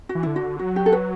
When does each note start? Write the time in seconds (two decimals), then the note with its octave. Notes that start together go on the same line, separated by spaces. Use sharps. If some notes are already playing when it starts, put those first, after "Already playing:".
0.09 F#4
0.15 E3
0.23 D3 E4
0.36 F#4
0.59 F#3 F#4
0.76 G4
0.86 A4
0.92 B4